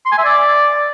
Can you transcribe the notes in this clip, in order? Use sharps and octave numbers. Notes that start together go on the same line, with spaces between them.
C6
G#5
E5
D5